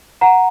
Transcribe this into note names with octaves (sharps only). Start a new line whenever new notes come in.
F#5 A#5